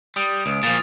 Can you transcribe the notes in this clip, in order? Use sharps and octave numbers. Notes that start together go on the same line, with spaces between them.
G3 D#6 D7
C#2
A#2 F3 A6 F7